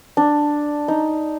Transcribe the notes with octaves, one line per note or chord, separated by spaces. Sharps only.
D4
D#4